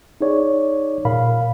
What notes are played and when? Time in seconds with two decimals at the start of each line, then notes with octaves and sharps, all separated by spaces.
0.21 D#4 G#4 C#5 D5
1.05 A#2 A#4 F5 B5